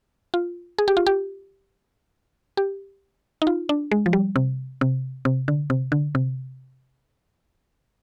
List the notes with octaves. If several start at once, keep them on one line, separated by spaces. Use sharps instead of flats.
F4
G#4
G4
F4
G4
G4
D#4
F4
D4
G#3
F3
G3
C3
C3
C3
D3
C3
D3
C3